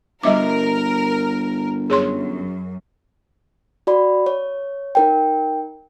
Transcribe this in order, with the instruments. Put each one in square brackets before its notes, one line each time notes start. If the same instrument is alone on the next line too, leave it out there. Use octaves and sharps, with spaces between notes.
[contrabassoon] G1 [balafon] G3 E5 D6 [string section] A#4
[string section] F#2 [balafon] G#4 C#5 C6
[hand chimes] F#4 D5 B5
C#5
D#4 A#4 G5